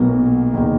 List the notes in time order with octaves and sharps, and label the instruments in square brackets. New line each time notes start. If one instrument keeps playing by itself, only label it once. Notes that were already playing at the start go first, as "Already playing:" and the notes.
Already playing: [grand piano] B1 A#2 F#3 A#3 [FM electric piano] B3
[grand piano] E2 D#3 A#3 D#4